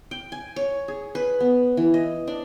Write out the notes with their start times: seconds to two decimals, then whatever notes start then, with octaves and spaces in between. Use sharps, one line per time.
0.11 G5
0.32 G#5
0.56 C#5
0.88 G#4
1.15 B4
1.40 B3
1.77 E3
1.94 D#5
2.28 D4